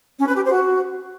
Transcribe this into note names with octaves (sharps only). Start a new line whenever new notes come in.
C#4
B4
G4
C5
F#4